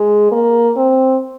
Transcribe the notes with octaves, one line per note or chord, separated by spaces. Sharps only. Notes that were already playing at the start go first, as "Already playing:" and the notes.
Already playing: G#3
A#3
C4